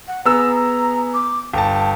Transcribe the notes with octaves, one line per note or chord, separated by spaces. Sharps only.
F#5
B3 G#4 A#5 E6
D6
G1 G5 A5